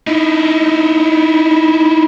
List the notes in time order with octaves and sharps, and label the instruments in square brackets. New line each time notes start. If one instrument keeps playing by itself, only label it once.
[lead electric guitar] D#4 E4